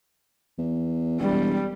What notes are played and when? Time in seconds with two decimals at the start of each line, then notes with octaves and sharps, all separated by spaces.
0.58 E2
1.20 E1 G3